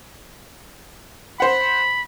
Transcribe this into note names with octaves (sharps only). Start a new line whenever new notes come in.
C5 F#5 B5